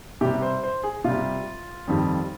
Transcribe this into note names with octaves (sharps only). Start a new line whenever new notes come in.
C3 G3 G4
C5
C5
G#4
C3 G3 F4
F2 D#3 G3